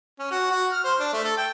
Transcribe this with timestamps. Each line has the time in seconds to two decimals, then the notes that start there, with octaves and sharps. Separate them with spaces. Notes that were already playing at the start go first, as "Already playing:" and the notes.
0.19 C#4
0.31 F#4
0.51 F#4
0.72 F6
0.84 C5
0.99 D4
1.13 A3
1.24 A4
1.37 G5